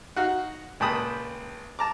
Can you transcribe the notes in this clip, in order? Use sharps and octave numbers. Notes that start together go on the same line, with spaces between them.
D#4 F#4 F5 F#5
C#2 A#2 G5 A5 B5 D#6
A5 A#5 D6